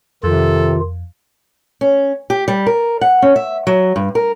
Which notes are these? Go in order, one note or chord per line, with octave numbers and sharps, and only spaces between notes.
F2 C3 D#3 F4 A4
C#4
G4
G3
A#4
F#5
C#4
E5
F#3
G2
A#4